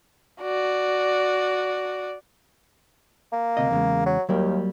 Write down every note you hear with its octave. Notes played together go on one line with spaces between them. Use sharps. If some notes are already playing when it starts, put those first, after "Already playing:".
F#4 D5
A#3
D2 C3 D#5
E2 C#3 G#3
F#3
D#2 F#3 G3 A#3